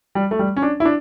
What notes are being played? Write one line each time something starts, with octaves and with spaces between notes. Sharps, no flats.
G3
A3
G3
C#4
D4
E4
D4